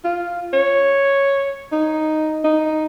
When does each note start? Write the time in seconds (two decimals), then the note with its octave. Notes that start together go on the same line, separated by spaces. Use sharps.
0.04 F4
0.53 C#5
1.72 D#4
2.44 D#4